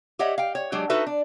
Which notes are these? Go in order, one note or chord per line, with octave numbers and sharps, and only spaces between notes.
G4 C#5 D#5 E5 F#5
F5 G5
C#5
F#3 G#3 D4 G4
D#4 F#4 A4 B4 E5
D4